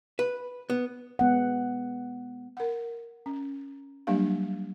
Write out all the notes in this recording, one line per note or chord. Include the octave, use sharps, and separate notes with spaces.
B4
B3
G#3 B3 F#5
A#4 F#5
C#4
F#3 G3 A#3 D4 G4 F5